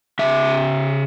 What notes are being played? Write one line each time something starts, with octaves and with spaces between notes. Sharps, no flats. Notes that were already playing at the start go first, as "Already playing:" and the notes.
C#3 E5